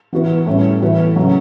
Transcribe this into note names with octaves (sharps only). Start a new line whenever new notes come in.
E3 B3 F#4 B4
A2 G3 C#4 E4
A2 E3 B3 F#4 B4
C#3 F#3